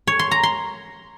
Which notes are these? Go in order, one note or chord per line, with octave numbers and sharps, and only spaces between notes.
C#5
C6
A#5
C6